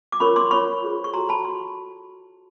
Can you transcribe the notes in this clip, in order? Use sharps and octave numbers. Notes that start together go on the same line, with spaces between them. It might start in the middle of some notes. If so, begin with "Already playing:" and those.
D6
C#4 F4 A#4 C#5 B5 C#6
C6 D6
F4 A#4 C#5 B5 C#6
F4 G#4 C5
C#6
F#4 A4 C5 A#5 C6
A5 B5
C6